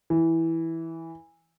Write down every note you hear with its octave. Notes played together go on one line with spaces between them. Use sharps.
E3